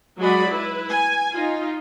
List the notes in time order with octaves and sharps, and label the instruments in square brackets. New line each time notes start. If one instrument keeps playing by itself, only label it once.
[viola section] F#3 G#3 F#4 G#4 D5 B5
E4 B4
G#5
D#4 F4